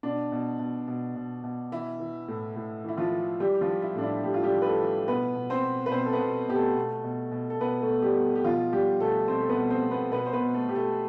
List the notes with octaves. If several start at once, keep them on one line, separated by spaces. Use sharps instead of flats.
B2 D4
B2
B2
B2
B2
B2
E3 E4
E3
A2
A2
E3 E4
F3 F4
E3
E3 G3 G4
F3 F4
E3
E4
A2 D4
E4
A2 G4
F4
G3 G4
E3
B4
A3 A4
E3
B2 B3 B4
B2
C4 C5
B2
B4
B2 C4 C5
A4
B3 B4
B2
B2 G4
A3 A4
B2
B2
B2
A4
B2 B3 B4
A3 A4
B2
G3 G4
B2
G4
B2 F3 F4
B2 G3 G4
B2 A3 A4
B2 C4 C5
A4
B3 B4
B2
C4 C5
B2
B3 B4
B2 B3 B4
C5
B3 B4
B2
A3 A4
B2 G4
A3 A4